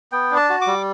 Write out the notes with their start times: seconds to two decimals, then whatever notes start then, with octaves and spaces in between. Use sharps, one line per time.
0.12 B3 G5
0.31 D4
0.36 A5
0.50 F#4
0.62 D6
0.67 G3